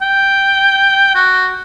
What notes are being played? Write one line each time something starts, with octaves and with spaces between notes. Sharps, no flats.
G5
F#4